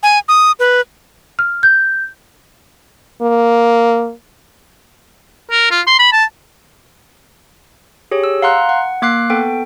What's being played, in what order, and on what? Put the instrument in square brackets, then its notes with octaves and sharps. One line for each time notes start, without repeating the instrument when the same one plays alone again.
[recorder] G#5
D#6
B4
[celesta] F6
G6
[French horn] A#3
[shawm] A#4
F4
C6
B5
A5
[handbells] G4 G#4 C#5
E6
F5 F#5 A#5 C6 F#6
F#5
A#3 D6 F#6 C7
B3 A4 G5